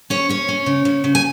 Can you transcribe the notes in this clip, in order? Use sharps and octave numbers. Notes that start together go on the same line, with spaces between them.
C#4 C#5
C#4 C#5
C#4
C#3
C#3
C#3
G#5